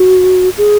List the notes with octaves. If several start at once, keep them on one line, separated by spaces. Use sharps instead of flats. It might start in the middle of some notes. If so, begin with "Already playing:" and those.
Already playing: F#4
G#4